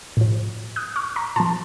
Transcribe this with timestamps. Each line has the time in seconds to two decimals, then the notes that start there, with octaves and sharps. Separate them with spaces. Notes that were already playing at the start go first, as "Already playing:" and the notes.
0.17 A2 F3
0.76 D#6 F#6
0.96 C#6 F6
1.16 A#5 C#6
1.36 A#2 F3 A5 C6